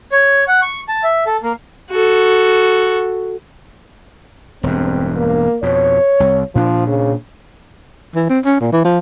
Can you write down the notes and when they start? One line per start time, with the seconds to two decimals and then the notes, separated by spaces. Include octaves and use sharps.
0.12 C#5
0.48 F#5
0.62 C#6
0.89 A5
1.04 E5
1.27 A4
1.43 A#3
1.91 F#4 A4
4.63 E1 G2 C4
5.16 A#3
5.63 F2 B2 C#5
6.20 C2
6.55 A#2 F3 D4
6.87 C#3
8.15 E3
8.29 C4
8.45 C#4
8.60 A#2
8.73 E3
8.85 F3